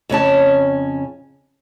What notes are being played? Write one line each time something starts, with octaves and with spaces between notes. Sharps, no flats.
F2 C#3 C#4 A5